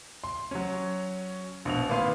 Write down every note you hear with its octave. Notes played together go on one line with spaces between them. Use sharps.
C6
F#3 C#4
A#1 B2 F7
G#1 A#3 B4 F5 C6